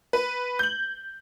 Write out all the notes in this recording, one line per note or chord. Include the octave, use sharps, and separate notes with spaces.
B4
G6 F#7